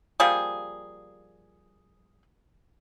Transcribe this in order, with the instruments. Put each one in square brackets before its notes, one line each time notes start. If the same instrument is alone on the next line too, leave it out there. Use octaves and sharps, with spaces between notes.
[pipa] F3 G3 A#3 G#4